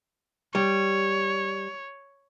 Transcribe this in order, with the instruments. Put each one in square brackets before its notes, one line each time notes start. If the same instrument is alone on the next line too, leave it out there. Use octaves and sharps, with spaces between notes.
[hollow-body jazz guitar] G3 [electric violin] C#5